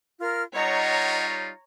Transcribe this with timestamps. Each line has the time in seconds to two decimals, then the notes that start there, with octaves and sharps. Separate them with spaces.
0.19 F4 A#4 F6
0.54 G3 D#4 F4 C#5 D#5 F#5 A#5